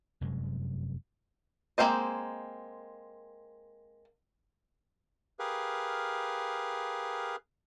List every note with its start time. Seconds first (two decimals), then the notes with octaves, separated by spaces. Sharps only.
0.21 F1 F#2 C3 G#3
1.78 G#3 A#3 C4 C5 D#5
5.39 G4 G#4 A#4 B4 F5